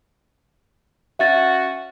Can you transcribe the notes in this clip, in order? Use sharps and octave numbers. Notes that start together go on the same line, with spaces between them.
C#4 F#4 E5 A6